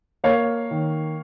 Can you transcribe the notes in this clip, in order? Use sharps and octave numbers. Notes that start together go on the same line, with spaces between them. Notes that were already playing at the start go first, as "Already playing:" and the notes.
A#3 C#5 F5
D#3